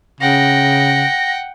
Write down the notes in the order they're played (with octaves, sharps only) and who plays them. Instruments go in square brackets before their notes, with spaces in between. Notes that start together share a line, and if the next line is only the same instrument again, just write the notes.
[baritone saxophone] C#3 [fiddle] F#5 G5 [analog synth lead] A#6